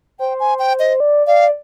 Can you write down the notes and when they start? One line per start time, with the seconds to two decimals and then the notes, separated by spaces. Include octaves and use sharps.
0.19 C5 G5
0.40 G#5
0.59 G5
0.79 D#5
1.00 D5
1.27 D5 F5